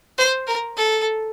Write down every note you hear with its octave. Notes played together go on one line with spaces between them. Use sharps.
C5
A#4
A4